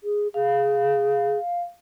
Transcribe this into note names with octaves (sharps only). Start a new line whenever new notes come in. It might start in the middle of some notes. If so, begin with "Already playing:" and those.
G#4
G#4 F5